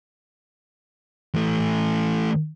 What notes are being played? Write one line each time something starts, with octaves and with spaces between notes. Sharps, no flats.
E3 A3